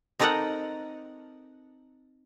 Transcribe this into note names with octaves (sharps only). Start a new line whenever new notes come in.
C4 D#4 A4 A#4 D#5 F#5